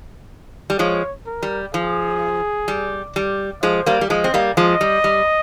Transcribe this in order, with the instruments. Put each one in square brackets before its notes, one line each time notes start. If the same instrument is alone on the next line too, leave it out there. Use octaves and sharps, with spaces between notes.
[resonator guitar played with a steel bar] G3
[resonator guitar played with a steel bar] F3 G#3 [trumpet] C#5
[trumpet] A#4
[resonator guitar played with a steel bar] G3
[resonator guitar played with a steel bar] F3 [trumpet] G#4
[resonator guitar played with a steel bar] G3
G3
[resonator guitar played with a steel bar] F3 G#3 [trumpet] C5
[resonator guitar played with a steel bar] G3 A#3
G3
[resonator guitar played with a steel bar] F3 G#3 [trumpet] D#5
[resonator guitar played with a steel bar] C4
G3 A#3
[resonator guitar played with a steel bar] F3 G#3 [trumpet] D#5
[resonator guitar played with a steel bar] G3
G3